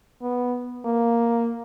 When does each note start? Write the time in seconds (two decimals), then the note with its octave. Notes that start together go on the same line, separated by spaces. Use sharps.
0.22 B3
0.85 A#3